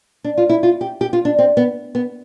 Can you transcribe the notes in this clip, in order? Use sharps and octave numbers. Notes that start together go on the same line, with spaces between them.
D4
F4
E4
F4
G4
G4
F4
D4
C4
B3
B3